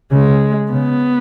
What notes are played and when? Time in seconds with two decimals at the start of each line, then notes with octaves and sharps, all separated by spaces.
0.11 C#3 G#3
0.73 C#3 B3